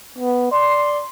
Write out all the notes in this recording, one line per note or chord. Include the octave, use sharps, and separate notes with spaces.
B3
D5 C6